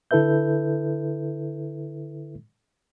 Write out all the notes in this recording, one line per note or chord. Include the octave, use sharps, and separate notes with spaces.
D3 E4 A4 B4 E5 G6